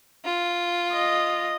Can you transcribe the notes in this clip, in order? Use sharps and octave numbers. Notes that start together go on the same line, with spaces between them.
F4
D#5